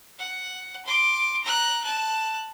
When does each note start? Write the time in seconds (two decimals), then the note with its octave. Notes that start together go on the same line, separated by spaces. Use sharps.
0.19 F#5
0.85 C6 D6
1.43 A#5 F#6
1.84 A5 F#6